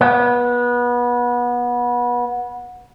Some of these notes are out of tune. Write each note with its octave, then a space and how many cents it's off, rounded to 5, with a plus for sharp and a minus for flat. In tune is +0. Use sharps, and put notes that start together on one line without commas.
B3 -25